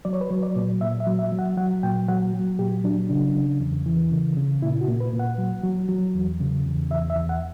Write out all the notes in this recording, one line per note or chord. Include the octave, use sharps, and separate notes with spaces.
F#3 D5
C#5
B4
F#3 C#5
D5
A#2
A#2 E5
E5
F#3
E5
F#3
F#5
F#3 F#5
A#2 G5
F#3 F#5
F#3
A#2 G4
F#3 D4
C#3 D4
C#3
E2
E3
C#3
C#3
A#2 E4
F#4
A#2
B4
A#2
F#5
F#3
F#3
F#3
E2
C#3
E2
E2 E5
E5
E2
F#5